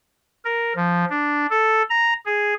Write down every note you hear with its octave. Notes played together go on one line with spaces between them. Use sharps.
A#4
F3
D4
A4
A#5
G#4